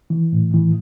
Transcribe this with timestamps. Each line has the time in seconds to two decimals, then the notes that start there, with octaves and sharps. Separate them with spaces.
0.10 E3
0.33 A2
0.54 E3